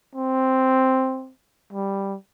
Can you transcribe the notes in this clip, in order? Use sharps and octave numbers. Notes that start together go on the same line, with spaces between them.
C4
G3